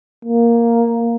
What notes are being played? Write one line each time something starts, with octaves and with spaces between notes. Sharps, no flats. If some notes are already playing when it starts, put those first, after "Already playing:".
A#3